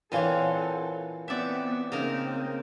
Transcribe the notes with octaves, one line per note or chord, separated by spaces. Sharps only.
A#2 E3 C4 A4 C#5 F5 F#5 G#5
B3 C4 D5 E5
C#3 A#3 C4 D#4 A#4